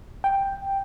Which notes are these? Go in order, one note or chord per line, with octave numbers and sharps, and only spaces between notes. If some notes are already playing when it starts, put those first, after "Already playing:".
G5